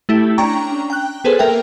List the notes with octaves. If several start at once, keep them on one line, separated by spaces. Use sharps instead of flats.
A3 E4 G4
C#4 D4 G5 A#5 C#6
G5 F#6
B3 G#4 A4 B4 C5
A#3 A#4 E5 G5